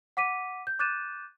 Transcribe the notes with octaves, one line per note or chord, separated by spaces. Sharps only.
F#5 D6 B6 D#7
G6
D6 F#6 G6 A6 D#7 E7